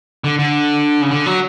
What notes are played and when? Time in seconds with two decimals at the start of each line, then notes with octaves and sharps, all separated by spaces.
0.24 D3
0.39 D3
1.02 C#3
1.11 D3
1.26 F#3